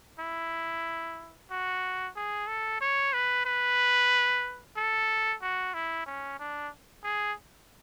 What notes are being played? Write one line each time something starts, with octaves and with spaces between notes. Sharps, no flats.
E4
F#4
G#4
A4
C#5
B4
B4
A4
F#4
E4
C#4
D4
G#4